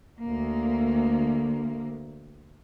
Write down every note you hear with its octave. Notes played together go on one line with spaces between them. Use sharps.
D2 A#3